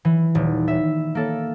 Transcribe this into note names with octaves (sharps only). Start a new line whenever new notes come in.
E3
D#1
E5
A#3 A4